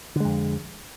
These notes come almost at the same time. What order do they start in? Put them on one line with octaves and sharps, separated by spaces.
D3 G#3 F2